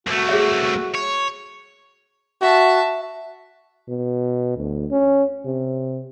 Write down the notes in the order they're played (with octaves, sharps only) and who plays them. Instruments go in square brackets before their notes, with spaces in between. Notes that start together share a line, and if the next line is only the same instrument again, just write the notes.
[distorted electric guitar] C2 A3 [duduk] F#4
[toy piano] G#4 C#5 E5
[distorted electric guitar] C#5
[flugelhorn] F#4 [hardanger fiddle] E5 A5
[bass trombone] B2
D2
C#4
C3